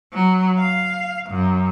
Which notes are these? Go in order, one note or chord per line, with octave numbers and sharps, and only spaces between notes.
F#3
F5
F#2